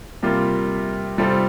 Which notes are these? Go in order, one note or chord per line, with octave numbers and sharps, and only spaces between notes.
C3 G3 A#3 F4
C3 G3 C4 F4 A4